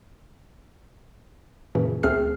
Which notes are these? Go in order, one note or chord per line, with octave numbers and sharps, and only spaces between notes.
F#2 A#2 C#3 E3
D2 A3 C4 G#4 F6 C7